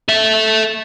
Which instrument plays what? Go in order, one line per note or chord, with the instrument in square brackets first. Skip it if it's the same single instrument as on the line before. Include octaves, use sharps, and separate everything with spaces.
[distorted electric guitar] A4 E5